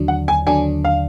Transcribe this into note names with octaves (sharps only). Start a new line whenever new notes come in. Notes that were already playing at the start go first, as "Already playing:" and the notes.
Already playing: D#2 D3 F#3 D4
F#5
G#5
D#2 D3 F#3 D4 G#5
F5